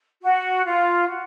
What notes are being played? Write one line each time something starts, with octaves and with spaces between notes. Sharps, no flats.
F#4
F4
F#4